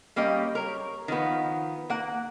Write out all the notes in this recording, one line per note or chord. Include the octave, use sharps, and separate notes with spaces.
G3 A#3 C#4 G4 D#5
A#4 C#5
D#3 F3 B3
A#3 F#5